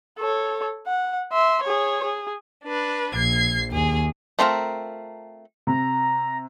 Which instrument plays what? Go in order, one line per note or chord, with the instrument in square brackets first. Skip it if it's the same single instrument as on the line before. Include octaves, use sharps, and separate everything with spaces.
[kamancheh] A4 C#5
F#5
E5 C6
G#4 C#5
G#4
[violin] D4 B4
[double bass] A#1 [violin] G#6 C7
[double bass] D#2 [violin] G#4
[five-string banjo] A3 C4 D4 F4 A#4
[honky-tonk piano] C3 [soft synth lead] A#5